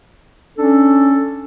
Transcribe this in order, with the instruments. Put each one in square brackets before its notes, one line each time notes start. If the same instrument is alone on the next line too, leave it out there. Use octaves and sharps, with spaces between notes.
[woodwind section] C#4 D4 A4